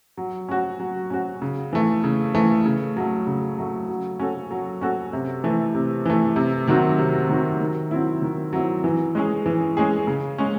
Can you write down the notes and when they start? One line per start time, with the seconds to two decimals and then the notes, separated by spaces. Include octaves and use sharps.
0.17 F#3
0.49 C#4 F#4
0.80 F#3
1.10 C#4 F#4
1.42 C#3
1.73 E3 A3
2.04 C#3
2.34 E3 A3
2.66 C#3
2.97 F#3 A3
3.27 C#3
3.58 F#3 A3
3.89 F#3
4.19 C#4 F#4 A4
4.51 F#3
4.81 C#4 F#4 A4
5.13 C3
5.44 E3 A3
5.75 C3
6.06 E3 A3
6.36 C3
6.68 D#3 F#3 C4 F#4
6.98 C3
7.29 D#3 F#3 C4 F#4
7.61 D#3
7.91 F#3 C4 E4
8.22 D#3
8.53 F#3 C4 E4
8.84 E3
9.15 G#3 C#4 G#4
9.46 E3
9.77 G#3 C#4 G#4
10.07 C#3
10.38 G#3 C#4